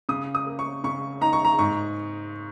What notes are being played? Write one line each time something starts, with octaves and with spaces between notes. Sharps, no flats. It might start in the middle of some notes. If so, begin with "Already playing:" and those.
C#3 D#6
D#6
A#3
C#6
C#3 C#6
D#4 A#5
C#6
A#5
G#2 C#6